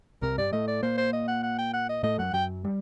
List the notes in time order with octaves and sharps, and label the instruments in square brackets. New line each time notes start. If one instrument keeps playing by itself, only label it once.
[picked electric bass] C2 C3 [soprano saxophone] A#4
[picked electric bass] G2 G3 [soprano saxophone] D5
[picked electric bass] A2 A3 [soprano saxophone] D#5
[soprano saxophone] D5
[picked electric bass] A#2 A#3 [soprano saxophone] C5
[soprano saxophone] C5
D#5
F#5
F#5
G5
F#5
D#5
[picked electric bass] A2 A3 [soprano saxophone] D#5
[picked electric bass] F#2 F#3 [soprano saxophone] F#5
[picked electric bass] F#2 F#3 [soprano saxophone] G5
[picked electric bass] G3